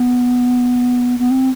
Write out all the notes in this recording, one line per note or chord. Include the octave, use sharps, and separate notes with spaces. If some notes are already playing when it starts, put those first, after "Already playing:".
Already playing: B3
B3
C4